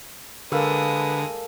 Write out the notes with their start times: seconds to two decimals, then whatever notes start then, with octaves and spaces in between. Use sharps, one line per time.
0.52 D3 G#3 A#3 A4 B4 D#6 E6